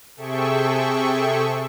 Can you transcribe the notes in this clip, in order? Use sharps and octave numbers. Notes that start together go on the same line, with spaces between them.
C3 G#4 A4 E5 G5 C#6